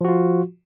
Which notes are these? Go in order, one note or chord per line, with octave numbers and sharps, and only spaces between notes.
F3 F4 F#4